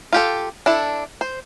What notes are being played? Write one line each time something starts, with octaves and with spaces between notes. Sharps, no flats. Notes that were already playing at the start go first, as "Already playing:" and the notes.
F4 G4 A4
D4 E4 A4
C5